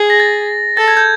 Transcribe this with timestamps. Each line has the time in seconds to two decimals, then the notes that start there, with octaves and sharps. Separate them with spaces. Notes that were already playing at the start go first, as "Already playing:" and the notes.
Already playing: G#4
0.10 A#6
0.20 A6
0.77 A4 A6
0.88 G#6
0.97 G6